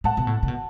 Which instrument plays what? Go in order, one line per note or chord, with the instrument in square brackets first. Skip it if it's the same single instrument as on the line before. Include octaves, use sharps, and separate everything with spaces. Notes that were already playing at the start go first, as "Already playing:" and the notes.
[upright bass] A2 [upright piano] F#5 A5
[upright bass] B2
A2
C3
B2